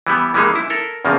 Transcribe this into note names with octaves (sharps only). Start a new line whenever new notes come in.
E3 G3 B3
E3 G3 G#3 A#3 D#4
E4
A4 A#4
E2 C#3 F3 A#3